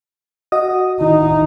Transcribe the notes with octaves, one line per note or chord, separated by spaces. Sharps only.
F#4 D#5 D#6
D#3 D#4 E4